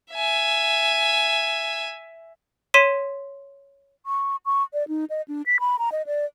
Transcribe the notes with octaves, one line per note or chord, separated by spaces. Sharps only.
E5 G#5
C#5 C6 B6 D#7 E7
C#6
C#6
D5
D#4
D#5
D4
B6
B5
A#5
D#5
D5